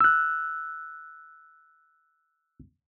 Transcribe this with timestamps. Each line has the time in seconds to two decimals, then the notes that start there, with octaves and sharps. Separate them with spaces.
0.01 E6 F#6